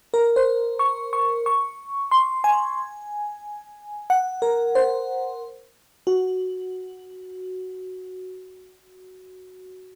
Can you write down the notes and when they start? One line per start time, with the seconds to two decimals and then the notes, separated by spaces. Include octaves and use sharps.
0.14 A#4
0.36 C5
0.79 C#6
1.13 C#6
1.46 C#6
2.11 C6
2.44 G#5
4.10 F#5
4.42 A#4
4.75 C5
6.07 F#4